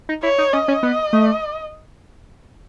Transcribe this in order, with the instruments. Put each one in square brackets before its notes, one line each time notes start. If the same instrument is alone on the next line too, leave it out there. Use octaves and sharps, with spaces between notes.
[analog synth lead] D#4
[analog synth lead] E4 [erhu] C#5
[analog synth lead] D#4
[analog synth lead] C#4 [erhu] D#5
[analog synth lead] C#4
B3
A3